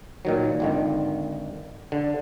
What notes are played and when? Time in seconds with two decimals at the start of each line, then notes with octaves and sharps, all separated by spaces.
0.25 A#2 D#3 F#3
0.60 G#1 D3 D#3
1.92 D3